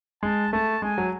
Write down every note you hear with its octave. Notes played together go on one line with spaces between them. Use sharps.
G#3 A5
A3 A5
G#3 G#5
F#3